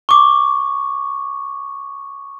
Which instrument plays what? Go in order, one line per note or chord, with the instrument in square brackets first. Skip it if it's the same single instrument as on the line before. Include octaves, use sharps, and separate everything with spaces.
[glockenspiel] C#6 D6